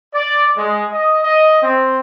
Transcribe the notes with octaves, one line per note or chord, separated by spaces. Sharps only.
D5
G#3
D#5
D#5
C4